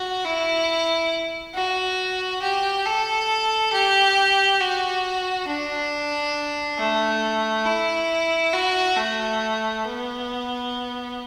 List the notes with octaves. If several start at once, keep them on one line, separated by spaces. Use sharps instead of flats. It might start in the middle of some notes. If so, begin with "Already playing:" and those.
Already playing: F#4
E4
F#4
G4
A4
G4
F#4
D4
A3
E4
F#4
A3
B3